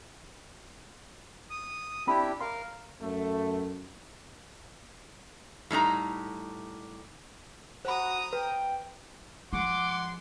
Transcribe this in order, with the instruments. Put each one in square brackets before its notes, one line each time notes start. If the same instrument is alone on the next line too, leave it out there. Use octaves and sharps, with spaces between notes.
[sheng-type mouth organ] D#6
[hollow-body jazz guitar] C4 B5 [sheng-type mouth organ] D4 E4 G4
[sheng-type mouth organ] A#4 F5 [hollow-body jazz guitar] C6
[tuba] F#2 [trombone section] A3
[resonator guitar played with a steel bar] A2 G3 D#4 A#5
[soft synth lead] F#4 [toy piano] C5 B5 [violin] A#5 D#6
[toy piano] B4 [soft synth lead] G5
[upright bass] F3 [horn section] G#3 C6 [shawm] F#5 [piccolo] D6